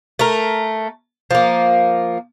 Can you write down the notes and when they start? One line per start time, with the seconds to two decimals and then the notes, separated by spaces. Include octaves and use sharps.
0.19 A3 A#4
1.31 F3 A#3